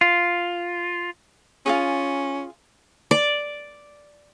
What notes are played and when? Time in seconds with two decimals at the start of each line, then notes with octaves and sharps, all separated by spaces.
0.01 F4
1.66 C#4 F4 F#4 G#4
3.11 D5